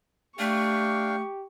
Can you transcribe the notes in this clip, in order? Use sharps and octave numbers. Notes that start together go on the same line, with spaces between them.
A3 D4 G4 F5 G5 C#6